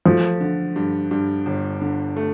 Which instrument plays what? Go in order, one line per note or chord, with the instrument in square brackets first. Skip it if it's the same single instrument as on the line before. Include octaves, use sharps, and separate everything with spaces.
[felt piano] F3 [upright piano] A3
[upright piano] D3
G2
G2
G1
D3
A3